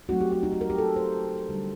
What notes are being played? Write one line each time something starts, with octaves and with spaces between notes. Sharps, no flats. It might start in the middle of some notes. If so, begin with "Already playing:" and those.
F#3 A3 C4 D#4 F#4
G4
F#4
D#4
F#4
A#4
G4
A4
C5
D3 G3 D4